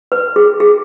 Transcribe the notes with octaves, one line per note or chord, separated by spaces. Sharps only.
B4
G#4
G#4